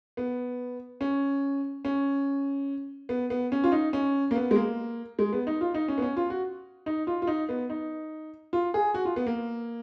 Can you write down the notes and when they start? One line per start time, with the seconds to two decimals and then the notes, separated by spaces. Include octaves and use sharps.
0.17 B3
1.01 C#4
1.85 C#4
3.09 B3
3.30 B3
3.52 C#4
3.64 F4
3.72 D#4
3.93 C#4
4.31 A#3
4.36 B3
4.51 G#3
4.56 A#3
5.19 G#3
5.33 B3
5.47 D#4
5.61 F4
5.74 D#4
5.88 C#4
5.98 B3
6.02 C#4
6.17 F4
6.30 F#4
6.86 D#4
7.07 F4
7.22 F4
7.27 D#4
7.49 B3
7.70 D#4
8.53 F4
8.74 G#4
8.94 F#4
9.05 F4
9.16 B3
9.27 A#3